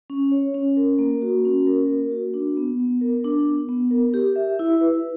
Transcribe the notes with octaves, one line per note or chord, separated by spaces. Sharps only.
C#4
C#5
C#4
A#4
A#3
F#4
C#4
A#4
A#3
F#4
D4
B3
B3
A#4
D4
B3
B3
A#4
G4
E5
E4
B4